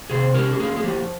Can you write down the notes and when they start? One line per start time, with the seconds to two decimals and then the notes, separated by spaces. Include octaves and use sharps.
0.10 C3 G#4 C5
0.34 C#4 G4 A#4
0.53 G4
0.59 A#3 F4 G#4
0.76 G#4
0.83 F3 G4